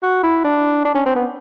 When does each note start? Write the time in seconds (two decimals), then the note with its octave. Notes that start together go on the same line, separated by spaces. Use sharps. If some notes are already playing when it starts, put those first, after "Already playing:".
0.03 F#4
0.23 E4
0.44 D4
0.85 D4
0.95 C#4
1.06 C4
1.16 B3